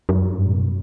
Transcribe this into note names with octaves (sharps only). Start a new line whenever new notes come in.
F#2
G2
A2
B2